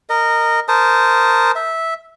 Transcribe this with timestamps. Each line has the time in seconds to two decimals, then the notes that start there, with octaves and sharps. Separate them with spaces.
0.09 A#4 D#5
0.68 A#4 C5 A5 D#6
1.55 E5